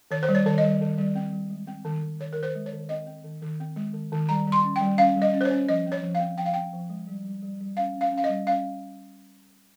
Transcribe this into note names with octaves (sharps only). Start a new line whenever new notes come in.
D#3 C#5
C5
G3
C#5
D#3 C#5
D#5
G3
D#3
G3
C4
G3
G#3
C4
D#3
D#3
D#3 C#5
D#3 A#4
C5
G#3
C#5
D#3
C4 D#5
C4
D#3
D#3
C4
G#3
D#3
D#3
G3 A#5
G3
C6
C#4
G5
G3
C#4 F5
G3
D#5
C#4
C5
C#5
C#4
F3 D#5
C4
C#5
F3
F5
C4
F3 G5
F5
C4 G5
F3
G#3
G3
G3
G3
G3
C#4 F5
C#4
F5
C#4
F5
D#5
G3
C#4 F5